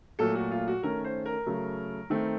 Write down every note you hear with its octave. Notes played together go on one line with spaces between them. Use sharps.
A#2 F#3 A3 A4
F#4
F4
F#4
D#3 A3 C#4 A#4
C5
A#4
C#3 F#3 A3
D#3 A3 C4